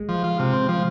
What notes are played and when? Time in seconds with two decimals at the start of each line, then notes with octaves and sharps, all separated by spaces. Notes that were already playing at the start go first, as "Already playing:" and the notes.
Already playing: G#3
0.09 F3
0.24 F4
0.39 C3
0.53 C4
0.69 F3